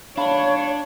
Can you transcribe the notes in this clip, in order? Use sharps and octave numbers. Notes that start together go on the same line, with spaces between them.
D4 C#5 F5 B5